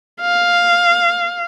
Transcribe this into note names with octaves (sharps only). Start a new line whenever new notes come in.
F5